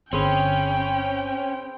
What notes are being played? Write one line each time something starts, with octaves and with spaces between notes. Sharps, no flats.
G1 D3 C4 C#4 G#4 B4 G5